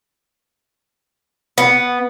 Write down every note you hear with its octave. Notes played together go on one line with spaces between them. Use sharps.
B3